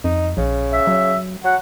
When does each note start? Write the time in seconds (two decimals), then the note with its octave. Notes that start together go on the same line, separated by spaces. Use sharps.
0.04 F2 D#4
0.37 A#1 C#3
0.73 E5
0.87 F#3
1.44 F#3 F#5